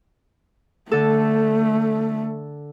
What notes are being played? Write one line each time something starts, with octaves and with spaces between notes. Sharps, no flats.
D3 A3 A4